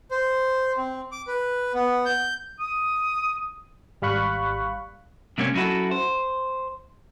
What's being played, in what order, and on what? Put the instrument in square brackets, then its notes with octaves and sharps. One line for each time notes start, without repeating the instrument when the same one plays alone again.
[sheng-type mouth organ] C5
C4
D6
B4
B3
G6
[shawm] D#6
[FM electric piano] G#1 G3 F5 B5 C#6 F#6
[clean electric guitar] C3 G3 A#3 C4 C#4
F#3 C#4 D#4 E4 F#4 A4
C5